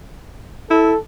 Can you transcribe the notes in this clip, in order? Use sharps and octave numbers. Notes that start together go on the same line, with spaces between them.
E4 A4